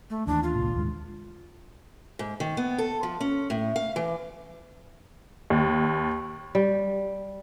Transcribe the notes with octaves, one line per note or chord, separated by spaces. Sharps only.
A3
D#2 E3 D4
F4
G#1 C#2 A#2
D#2 G#2 G#3
G#2
D#3
B3
A4
F3
C#4
A2
F5
E3
D#2
G3